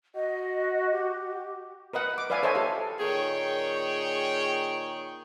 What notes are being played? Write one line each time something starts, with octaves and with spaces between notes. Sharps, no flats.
F#4 D#5
G4
A#4 B4 D#5 F#5
D6
B4 D5 E5 F5 G#5
A4 C5 C#5 D#5 E5 G#5
G4 A4 F5
A#2 D#3 G#4 C#5 G5